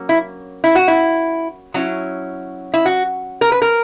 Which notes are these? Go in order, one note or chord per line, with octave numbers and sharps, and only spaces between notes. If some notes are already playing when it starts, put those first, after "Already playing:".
Already playing: F#3 A#3 C#4
E4
E4
F#4
E4
F#3 C#4 E4
E4
F#4
A#4
B4
A#4